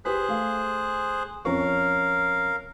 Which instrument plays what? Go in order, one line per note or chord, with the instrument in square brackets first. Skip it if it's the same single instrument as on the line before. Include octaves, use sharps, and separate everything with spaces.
[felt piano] G4 B4 B6 [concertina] G#4 C5 F#6
[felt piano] A3 F5
[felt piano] F2 C#4 C#6 [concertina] A#4 F5